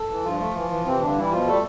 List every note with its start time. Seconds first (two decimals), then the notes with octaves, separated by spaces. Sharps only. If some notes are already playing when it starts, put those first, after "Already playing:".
Already playing: A4
0.09 E3
0.24 G2 F3 F4
0.40 A3
0.55 E3
0.70 E3
0.86 C3 E3 C4
1.01 G2 D3 D4
1.16 E3 G3 E4
1.31 B2 F3 F4
1.47 G3 A3 A4